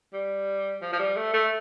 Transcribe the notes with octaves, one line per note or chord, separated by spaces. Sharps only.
G3
F3
F3
G3
A3
A3